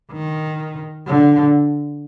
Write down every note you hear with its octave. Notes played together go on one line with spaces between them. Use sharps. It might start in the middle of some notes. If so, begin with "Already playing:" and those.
D#3
D3